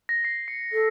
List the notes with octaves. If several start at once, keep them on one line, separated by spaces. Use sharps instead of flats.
A#6
C7
C#7
A4